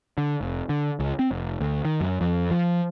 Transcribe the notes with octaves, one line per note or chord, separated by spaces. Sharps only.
D3
F1
D3
C#2
C4
F1
D2
D#3
F#2
F2
F3